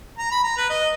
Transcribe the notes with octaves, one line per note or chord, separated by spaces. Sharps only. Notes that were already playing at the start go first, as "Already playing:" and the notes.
A#5
B5
A#5
B4
D#5